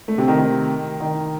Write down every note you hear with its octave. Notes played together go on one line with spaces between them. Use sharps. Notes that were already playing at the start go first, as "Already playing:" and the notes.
A3
C3
D#3
D#3
D#3